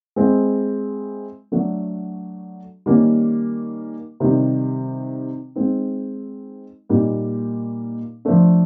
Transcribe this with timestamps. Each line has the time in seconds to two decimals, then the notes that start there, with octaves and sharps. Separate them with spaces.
0.16 G#3 C4 E4
1.52 F#3 A3 D4 F#4
2.86 D#3 G3 A#3 C#4
4.20 C3 D#3 G3
5.56 G#3 C4 D#4
6.89 A#2 G3 A#3 D#4
8.25 F3 A3 D4